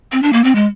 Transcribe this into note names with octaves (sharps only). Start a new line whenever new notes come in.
C4
D4
A#3
C4
G#3